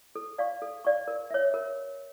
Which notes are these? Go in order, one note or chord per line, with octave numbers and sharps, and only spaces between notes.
A4
D5 F5 C#6
A4
D5 F5 C#6
A#4
C#5 E5
A#4